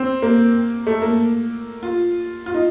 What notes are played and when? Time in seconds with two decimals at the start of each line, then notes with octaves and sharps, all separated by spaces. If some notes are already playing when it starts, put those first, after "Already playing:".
Already playing: C4
0.22 A#3
0.87 A3
1.02 A#3
1.83 F4
2.46 F4
2.54 D#4